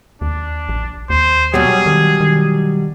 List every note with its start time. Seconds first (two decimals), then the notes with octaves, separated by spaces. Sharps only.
0.21 D#2 D4
0.69 A#1
1.10 D#2 C5
1.54 B2 F#3 G3 G#4
1.86 D#3
2.20 D#3